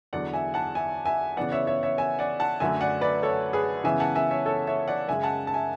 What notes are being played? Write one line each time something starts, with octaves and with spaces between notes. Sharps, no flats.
E2 D3 F#3 D5 F#5
E5 G#5
F#5 A5
E5 G#5
E5 G#5
C#3 E3 B3 D5 F#5
C#5 E5
C#5 E5
C#5 E5
E5 G#5
D5 F#5
F#5 A5
F#2 D3 F#3 A3 E5 G#5
D5 F#5
B4 D5
A4 C#5
G#4 B4
C#3 E3 G#3 B3 E5 G#5
F#5 A5
E5 G#5
C#5 E5
A4 C#5
C#5 E5
D5 F#5
F#2 C#3 G#3 E5 G#5
F#5 A5
A5
E5 G#5